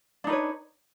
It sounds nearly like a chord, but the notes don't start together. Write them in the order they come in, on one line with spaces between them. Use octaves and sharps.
D4 D#4 B4 C#5